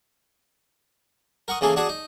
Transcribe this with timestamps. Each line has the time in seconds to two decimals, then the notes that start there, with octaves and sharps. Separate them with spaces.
1.48 A#4 F#5 C#6 D#6
1.61 C#3 E3 A#3 G#4 A4
1.76 D4 F#4 G#4 A5 D#6
1.89 D#4